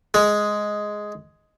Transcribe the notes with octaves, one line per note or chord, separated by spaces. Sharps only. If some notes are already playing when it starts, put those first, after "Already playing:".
G#3